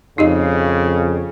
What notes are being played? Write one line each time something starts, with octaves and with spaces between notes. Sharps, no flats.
F2 C#3 D#4 G4 D#5